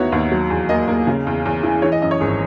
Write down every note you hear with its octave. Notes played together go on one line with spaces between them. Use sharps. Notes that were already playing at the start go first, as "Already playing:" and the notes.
Already playing: D#2 B3 D#4 E4 F#4 C#5
D#2
F#3
E2
A#3 D#5
A#3
C#3
E2
E2
E3
E3 C#5
D#5
F#2 D#5
C#5
G#1 G#4